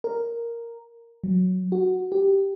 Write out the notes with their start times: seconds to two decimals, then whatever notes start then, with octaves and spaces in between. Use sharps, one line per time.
0.04 A#4
1.24 F#3
1.72 F#4
2.12 G4